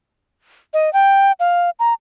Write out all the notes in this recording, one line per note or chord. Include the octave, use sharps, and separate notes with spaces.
D#5
G5
F5
A#5